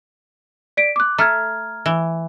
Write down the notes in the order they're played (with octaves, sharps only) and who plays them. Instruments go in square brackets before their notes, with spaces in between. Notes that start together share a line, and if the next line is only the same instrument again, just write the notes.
[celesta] D5 B6 D7
D6 F#6
[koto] A3 [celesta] A#5 F6 G#6
[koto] E3